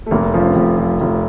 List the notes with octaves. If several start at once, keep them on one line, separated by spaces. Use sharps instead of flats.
A3
F1 A#3
F3 C#4
C4
F1
F3
F1